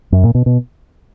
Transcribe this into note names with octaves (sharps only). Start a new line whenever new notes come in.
F#2
A#2
B2
B2